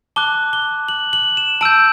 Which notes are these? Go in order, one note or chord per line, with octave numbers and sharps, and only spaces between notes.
A5 D6 F#6 G7
G7
F#7
F#7
E7
A5 E6 G6 D7